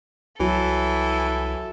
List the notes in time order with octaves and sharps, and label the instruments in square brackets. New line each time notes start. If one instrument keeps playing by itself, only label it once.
[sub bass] C2 [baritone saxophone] E3 [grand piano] F#3 [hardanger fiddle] A4 E5